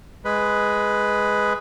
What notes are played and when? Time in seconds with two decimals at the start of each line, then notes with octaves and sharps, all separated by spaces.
0.25 G#3 B4